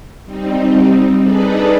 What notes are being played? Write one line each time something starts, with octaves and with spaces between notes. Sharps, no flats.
G3 C4 D#4
D4 D#4 G#4 A4 B4 D5